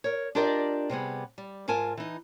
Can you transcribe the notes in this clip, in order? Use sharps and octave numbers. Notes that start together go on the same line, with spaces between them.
A#4 C#5
D4 F4 G4 A#4 D5 D#5
C3 G3 B3 G#4
G3
G#2 F4 A#4 G#5 A5
E3 D#4